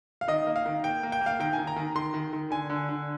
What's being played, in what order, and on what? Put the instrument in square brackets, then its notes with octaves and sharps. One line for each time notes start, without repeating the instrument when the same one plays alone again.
[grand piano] F5
D#3 D#5
A#3
F5
D#3
A#3 G5
A#3
G5
A#3
F5
D#3 G5
G#5
D#3
A#5
D#3
D#3 C6
D#3
D#3
D3 G#5
D3
D3